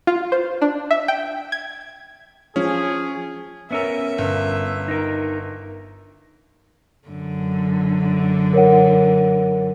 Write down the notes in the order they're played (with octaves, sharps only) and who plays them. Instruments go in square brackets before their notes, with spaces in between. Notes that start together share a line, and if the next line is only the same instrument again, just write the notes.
[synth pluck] F4
C5
D4
E5
G5
G#6
[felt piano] F3 [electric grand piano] C#4 [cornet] G#4
[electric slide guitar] B3 C#4 A#4 [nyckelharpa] E5
[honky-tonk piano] G1
[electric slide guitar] D#4 A#4
[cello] F#2 D3
[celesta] A#4 C#5 F#5